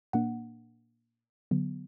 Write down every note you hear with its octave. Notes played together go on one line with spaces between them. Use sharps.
A#2 A#3 D4 F#5
D3 F#3 B3